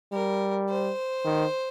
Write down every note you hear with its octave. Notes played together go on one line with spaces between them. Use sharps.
G3 A#4
C5
D#3